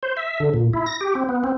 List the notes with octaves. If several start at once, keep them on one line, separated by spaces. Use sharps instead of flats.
C5
E5
D3
A#2
E4
A#6
G4
C4
B3
C4